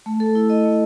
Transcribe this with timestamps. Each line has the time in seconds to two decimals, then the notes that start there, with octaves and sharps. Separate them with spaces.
0.06 A3
0.20 A4
0.35 E4
0.50 D#5
0.65 A3